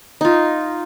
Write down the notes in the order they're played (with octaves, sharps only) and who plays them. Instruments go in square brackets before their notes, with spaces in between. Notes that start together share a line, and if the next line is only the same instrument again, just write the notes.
[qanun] D#4 F4